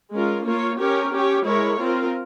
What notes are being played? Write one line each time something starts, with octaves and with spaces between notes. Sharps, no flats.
G#3 C#4 F4 A#4
A#3 F4 A#4 C#5
C#4 G4 A#4 C#5
C#4 G4 C#5
G#3 E4 A#4 C#5
C4 F4 A#4